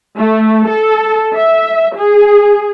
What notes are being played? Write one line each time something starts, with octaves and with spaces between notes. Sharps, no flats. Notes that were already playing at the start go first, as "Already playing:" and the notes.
A3
A4
E5
G#4